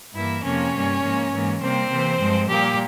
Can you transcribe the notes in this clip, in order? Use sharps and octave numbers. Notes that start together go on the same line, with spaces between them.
G2 E3 A#3 E4 E5
F2 C3 F3 A#3 C#4 C#5
G2 G3 A#3
G#2 F3 A#3
G#2 E3 A#3
C3 G3 A#3 C4 C5
C3 E3 A#3
G2 F3 G#3
A#2 G3 A#3 G4